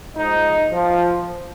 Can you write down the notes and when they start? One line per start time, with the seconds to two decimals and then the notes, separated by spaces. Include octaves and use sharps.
0.15 G#2 F3 D#4
0.71 F3